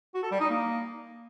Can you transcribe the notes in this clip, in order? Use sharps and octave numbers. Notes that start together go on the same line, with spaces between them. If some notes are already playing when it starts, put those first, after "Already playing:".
F#4
A4
G3
D#4
A#3